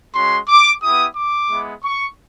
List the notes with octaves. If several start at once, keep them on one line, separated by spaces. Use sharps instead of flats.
G#3 C#4 F#4 C6
D6
B3 E4 G4 D#6
D6
G#3 B3 E4
C#6